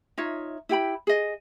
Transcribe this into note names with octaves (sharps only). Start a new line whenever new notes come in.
D#4 F4 C#5 E5
E4 G4 G5 B5
G#4 D#5